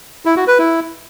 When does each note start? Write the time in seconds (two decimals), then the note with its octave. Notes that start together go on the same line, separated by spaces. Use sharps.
0.26 E4
0.37 F#4
0.47 B4
0.58 E4